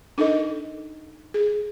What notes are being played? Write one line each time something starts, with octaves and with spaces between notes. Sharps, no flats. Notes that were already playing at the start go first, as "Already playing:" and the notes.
D4 D#4 A4 A#4 D#5
G#4